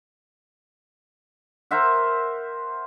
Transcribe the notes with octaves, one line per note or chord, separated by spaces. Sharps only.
A#4 C5 E5 F#5